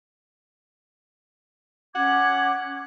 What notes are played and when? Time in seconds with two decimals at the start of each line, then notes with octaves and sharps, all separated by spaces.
1.95 C#4 F#5 D6 G#6